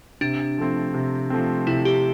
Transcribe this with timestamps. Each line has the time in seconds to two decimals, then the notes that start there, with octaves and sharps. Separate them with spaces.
0.21 C3 D4
0.58 F3 A3 C4
0.94 C3
1.30 F3 A3 C4
1.67 C3 E4
1.85 G4